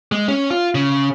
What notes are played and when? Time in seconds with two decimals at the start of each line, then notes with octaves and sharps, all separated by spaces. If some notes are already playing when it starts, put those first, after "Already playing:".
0.12 G#3
0.28 C#4
0.51 F4
0.75 C#3